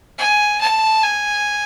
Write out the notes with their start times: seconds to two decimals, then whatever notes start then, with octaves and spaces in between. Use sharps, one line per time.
0.18 G#5
0.61 A5
1.03 G#5